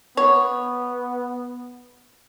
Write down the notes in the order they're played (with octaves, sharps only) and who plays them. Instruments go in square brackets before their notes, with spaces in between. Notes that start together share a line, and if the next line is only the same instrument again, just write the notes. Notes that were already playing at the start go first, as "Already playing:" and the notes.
[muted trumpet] B3 [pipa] C#5